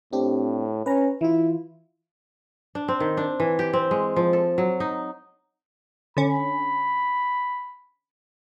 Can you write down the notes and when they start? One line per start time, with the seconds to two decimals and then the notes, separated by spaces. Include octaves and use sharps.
0.13 A2 C4 D4 G4
0.86 C#4 B4 A#5
1.21 E3 E4 F4
2.75 D4
2.88 C4
3.00 D#3
3.17 D4
3.40 E3
3.59 G4
3.73 C4
3.91 G#3
4.16 F3
4.33 A4
4.58 F#3
4.80 D#4
6.17 D3 C#4 B5